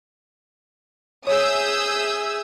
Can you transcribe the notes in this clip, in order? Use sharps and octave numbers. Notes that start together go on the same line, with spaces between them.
G#4 C#5 E5 G#5 D#6 E6 G6